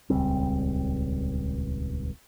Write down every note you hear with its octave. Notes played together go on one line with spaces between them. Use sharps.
D#1 C#2 G3 C4